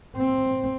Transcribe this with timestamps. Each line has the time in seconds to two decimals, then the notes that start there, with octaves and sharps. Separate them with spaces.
0.17 C4